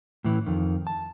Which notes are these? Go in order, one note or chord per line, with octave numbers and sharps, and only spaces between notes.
A2 E3
F2 D#3
A5